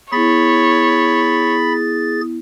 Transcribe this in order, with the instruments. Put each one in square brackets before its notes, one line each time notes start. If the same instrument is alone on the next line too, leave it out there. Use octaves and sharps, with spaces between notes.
[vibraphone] B3 E4 [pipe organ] G#4 A6 [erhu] C#5 [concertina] B5